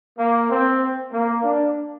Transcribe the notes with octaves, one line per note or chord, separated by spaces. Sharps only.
A#3
C4
A#3
D4